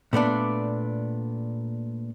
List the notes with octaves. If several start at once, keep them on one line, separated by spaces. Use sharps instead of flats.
A#2 A3 B3 D4